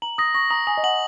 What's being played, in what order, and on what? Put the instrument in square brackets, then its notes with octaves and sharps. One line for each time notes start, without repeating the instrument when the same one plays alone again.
[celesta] A#5 [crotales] F#7
[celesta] D#6 [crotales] A#6
[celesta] C#6 [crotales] A#6
[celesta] A#5 [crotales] D#6
[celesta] G#5 [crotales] D#6
[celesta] D#5
[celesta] F#5 [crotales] F#7